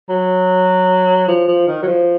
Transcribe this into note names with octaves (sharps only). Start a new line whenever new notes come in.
F#3
F3
F3
D#3
F#3
F3